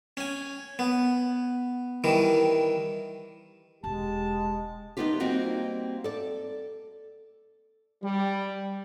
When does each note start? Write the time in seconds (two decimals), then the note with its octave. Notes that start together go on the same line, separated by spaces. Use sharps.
0.17 C#4 G#5
0.79 B3
2.04 D#3 E3 G3
3.84 E1 G#3 G4 A5
4.97 D#3 G3 B3 D#4 F4 G4
5.20 G3 A#3 C4 F#4 G4 D#5
6.04 A4 D5
8.03 G3